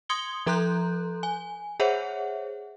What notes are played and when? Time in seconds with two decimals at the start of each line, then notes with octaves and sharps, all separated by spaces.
0.09 C6 D#6 G#6 C#7 G7
0.46 F3 A4 A#5 C6 F#6 G6
1.23 G#5
1.80 G#4 C5 C#5 E5 F#5